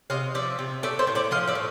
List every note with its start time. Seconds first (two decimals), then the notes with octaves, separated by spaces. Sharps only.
0.10 C3 D#5 F5
0.34 F3 D5 E5
0.59 C3
0.83 A3 D5 E5
0.99 C5 D5
1.07 A2
1.15 D5 E5
1.31 F3 D#5 F5
1.48 D5 E5
1.55 A2